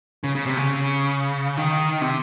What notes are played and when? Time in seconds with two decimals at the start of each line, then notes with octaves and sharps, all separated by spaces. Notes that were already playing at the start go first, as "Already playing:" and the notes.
0.24 C#3
0.35 C#3
0.46 C3
0.57 C#3
1.57 D#3
2.01 C3